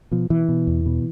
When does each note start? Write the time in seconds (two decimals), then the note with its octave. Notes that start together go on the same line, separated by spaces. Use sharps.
0.11 B2 F3
0.30 B2 E3
0.49 B2
0.67 E2
0.86 B2